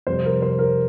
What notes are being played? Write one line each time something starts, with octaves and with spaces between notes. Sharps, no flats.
F2 C3 G3 C5
A#4
C5
A#4